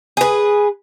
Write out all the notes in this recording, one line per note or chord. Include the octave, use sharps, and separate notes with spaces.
G#4 B4